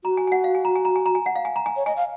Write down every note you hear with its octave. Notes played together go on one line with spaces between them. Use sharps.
F#4 A#5
G#5
G#5
F#5
F5
G#5
A#5
G#5
A#5
G#5
A#5
G#5
F#5
F5
G#5
A#5
G#5
C#5
D#5 G#5
F5